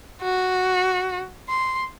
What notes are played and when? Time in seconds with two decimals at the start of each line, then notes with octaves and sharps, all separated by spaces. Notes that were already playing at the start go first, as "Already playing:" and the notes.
0.22 F#4
1.49 C6